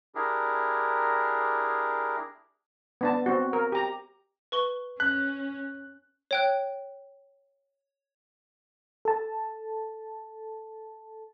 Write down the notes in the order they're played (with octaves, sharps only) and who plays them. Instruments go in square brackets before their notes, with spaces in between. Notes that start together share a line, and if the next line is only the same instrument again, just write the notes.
[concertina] D4 E4 G4 G#4 A#4
[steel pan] B3 D4 A5
C4 F#4
A#4
G4 A#5
[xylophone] B4 C#6 G7
[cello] C#4 [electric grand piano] F#6 [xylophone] B6
[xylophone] C#5 G5 F#6
[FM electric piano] A4 A5